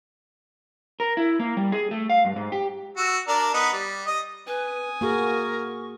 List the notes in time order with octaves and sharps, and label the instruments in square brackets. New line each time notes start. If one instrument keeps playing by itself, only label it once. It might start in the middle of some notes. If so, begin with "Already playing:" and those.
[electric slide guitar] A#4
E4
A#3
G3
G#4
A3
F5
G2
G#2
G4
[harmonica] F#4 E6
D4 A#4 D5
B3 D#4 B4
G3
D#5
[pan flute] B4 [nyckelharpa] G#5 D#6
[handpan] A#3 F#4 G#4 [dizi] A#4 [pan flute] C#6